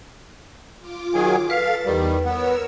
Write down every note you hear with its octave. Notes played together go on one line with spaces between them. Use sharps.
F4 D6
D#3 F#3 G#4
A4 B4 F5 A6
E2 D#3 G3
B3 A#4 C#5 E6